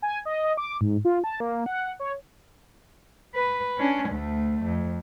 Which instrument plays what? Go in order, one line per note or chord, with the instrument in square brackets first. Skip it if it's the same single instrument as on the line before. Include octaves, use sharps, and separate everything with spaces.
[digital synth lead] G#5
D#5
D6
G#2
F4
A5
A#3
F#5
C#5
[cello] B4
C#4 D4
D2 A3
F2